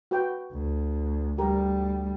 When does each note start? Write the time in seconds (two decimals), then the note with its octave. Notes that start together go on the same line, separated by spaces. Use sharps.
0.11 F#4 B4 G5
0.52 D2
1.38 D2 G3 G4 A#4